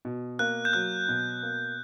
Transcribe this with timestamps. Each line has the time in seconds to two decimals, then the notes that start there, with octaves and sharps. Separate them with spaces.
0.05 B2
0.39 A#3 F#6
0.65 G6
0.73 F#3 F#6
1.09 B2
1.43 A#3